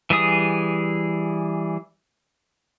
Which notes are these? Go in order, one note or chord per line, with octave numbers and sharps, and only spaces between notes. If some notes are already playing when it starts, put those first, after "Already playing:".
E3 G3 G#4 D#6